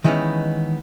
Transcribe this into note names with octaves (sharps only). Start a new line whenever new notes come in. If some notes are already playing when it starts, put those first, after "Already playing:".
D#3 E3 G#3 B3 C#4 D#4